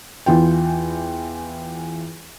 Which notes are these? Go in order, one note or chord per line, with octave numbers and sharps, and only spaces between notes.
E2 E3 F4 G5